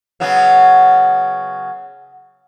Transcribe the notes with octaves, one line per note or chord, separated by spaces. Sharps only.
C#3 F#3 B3